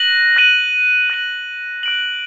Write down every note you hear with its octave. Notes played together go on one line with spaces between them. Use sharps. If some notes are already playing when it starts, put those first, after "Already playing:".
Already playing: F#6 A#6 D#7 F#7
F#6 A#6 D#7 F#7
F#6 A#6 D#7 F#7
F#6 D7 F#7